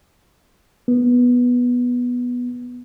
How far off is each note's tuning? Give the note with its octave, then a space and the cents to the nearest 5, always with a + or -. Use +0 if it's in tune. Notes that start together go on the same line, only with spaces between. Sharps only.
B3 -10